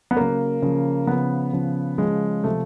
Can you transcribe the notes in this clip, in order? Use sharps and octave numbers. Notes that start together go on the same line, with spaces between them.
B3
C#3 F#3 A#3
C#3 F3
C#3 F3 B3
C#3 F3
C#3 F3 G#3
C3 F3 A3